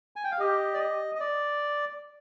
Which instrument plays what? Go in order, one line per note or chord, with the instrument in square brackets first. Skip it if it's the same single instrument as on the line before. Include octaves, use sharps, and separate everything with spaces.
[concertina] G#5
G5
F5
[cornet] G4 [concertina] D#5
[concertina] D5
D#5
D#5
D5